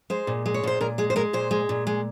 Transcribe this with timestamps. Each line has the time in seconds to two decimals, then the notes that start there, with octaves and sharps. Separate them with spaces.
0.10 G#3 C5
0.27 A#2
0.46 G#3
0.54 C#5
0.64 A#2 C5
0.81 A#2 A#4
0.98 G#3 G#4
1.10 C5
1.16 G#3 A#4
1.33 A#2 C5
1.51 G#3
1.69 A#2
1.87 G#3